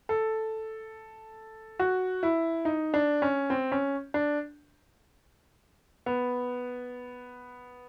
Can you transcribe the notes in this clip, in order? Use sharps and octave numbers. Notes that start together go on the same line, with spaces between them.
A4
F#4
E4
D#4
D4
C#4
C4
C#4
D4
B3